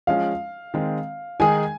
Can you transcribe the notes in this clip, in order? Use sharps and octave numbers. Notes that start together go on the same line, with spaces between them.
F3 G#3 C#4 F5
D#3 G#3 C4
D#3 G#3 D#4 G#4 G#5